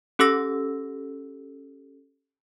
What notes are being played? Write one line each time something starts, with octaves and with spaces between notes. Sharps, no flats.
C#4 G4 A4 E6 A#6